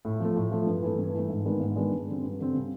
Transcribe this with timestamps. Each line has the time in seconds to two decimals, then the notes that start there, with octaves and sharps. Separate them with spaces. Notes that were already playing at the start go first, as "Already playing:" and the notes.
0.05 A2
0.20 F3 A3
0.36 A2
0.52 F3 A3
0.67 G2
0.82 E3 A3
0.99 G2
1.14 E3 A3
1.30 G#2
1.45 D#3 G#3 B3 D4
1.61 G#2
1.76 D#3 G#3 B3 D4
1.92 G2
2.08 D3 G3 C4
2.23 G2
2.39 D3 G3 C4
2.54 C#3